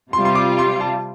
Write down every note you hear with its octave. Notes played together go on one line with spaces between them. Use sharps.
C3 G3 F4 C6
C6
D6
C6
A5